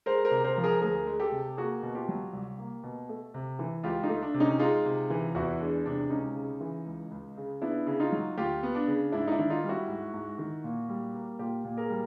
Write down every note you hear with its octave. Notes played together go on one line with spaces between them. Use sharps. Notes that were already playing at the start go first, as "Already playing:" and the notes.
G#3 A#4 C5
A#4 C5
C3
A#4 C5
F3
G#4 A#4
D2 G#4 A#4
G#3
G4 A4
C3
A#3 F#4 G#4
B2
F4 G4
F#3
C2
A#3
B2
A3
C3
E3
C#2 F4 G4
D#4 F4
A3
D4
C3
C#4 D#4
G#3 D#4 F4
C3
E3
E2 E4 F#4
G#3 D4
C3 D4
C#2 C#4 D#4
C#3
E3
C#2
C#2
C#3
B3 D4 E4
C#3
D#4 F4
F#3
D2 F4 G4
B3
D4
C#3
G#2 D4 E4
D#4
D4 E4
D#3
D#4 F4
G3
E4 F#4
G#2
G#2
D#3
A#2
G3
A#3
A#2 F4 G4
A#2
G#4 A#4
G3